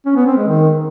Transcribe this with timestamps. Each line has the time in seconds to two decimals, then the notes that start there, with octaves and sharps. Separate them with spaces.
0.06 C#4
0.16 B3
0.27 C4
0.37 G#3
0.47 D#3